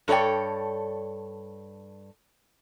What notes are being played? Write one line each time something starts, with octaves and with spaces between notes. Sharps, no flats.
G2 A4 C#5 D5 G5